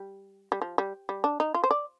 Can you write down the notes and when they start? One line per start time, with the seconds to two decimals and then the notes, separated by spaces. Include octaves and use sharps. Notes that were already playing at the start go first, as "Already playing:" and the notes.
Already playing: G3
0.52 G3
0.62 F3
0.78 G3
1.09 G3
1.24 D4
1.40 D#4
1.54 F4
1.64 C5
1.71 D5